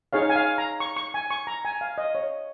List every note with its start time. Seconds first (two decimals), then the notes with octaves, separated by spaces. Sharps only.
0.13 D#4 G#4 C#5 F5
0.29 G#5
0.36 F5
0.58 A#5
0.80 C#6
0.97 C#6
1.14 G#5
1.31 C#6
1.47 A#5
1.65 G#5
1.81 F5
1.98 D#5
2.15 C#5